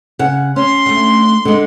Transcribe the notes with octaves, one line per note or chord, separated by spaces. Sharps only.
C#3 F#5
C#4 C6
D3 A3
D3 G#3